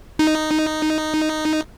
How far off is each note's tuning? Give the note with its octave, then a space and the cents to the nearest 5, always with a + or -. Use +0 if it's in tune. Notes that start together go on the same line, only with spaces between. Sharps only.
D#4 -5